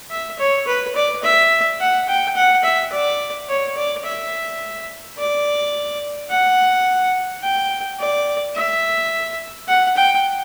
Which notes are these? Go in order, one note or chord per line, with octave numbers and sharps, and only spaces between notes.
E5
C#5
B4
D5
E5
F#5
G5
F#5
E5
D5
C#5
D5
E5
D5
F#5
G5
D5
E5
F#5
G5